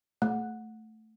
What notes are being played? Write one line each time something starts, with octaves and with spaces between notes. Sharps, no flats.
A3